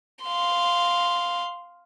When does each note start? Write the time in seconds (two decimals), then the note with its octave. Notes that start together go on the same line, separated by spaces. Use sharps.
0.24 F5 C6